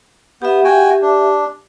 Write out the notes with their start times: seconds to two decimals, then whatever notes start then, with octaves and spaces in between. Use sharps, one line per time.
0.42 B3 G4 E5
0.64 F#4 G5 G#5
1.02 D4